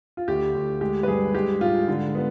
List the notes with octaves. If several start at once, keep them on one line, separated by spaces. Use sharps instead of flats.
F4
D2 G4
D2
G#3 G4
B4
G2 G#4
G#3 G4
G#2 F4
D3
B3